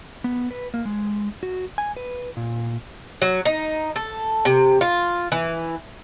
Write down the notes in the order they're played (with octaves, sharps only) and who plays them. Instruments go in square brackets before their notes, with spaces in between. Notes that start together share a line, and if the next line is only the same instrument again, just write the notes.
[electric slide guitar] B3
B4
A#3
G#3
F#4
G#5
B4
A#2
[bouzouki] F#3
D#4
A4
C3
F4
E3